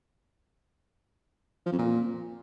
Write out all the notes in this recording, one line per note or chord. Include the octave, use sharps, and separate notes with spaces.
F3
F2
A#2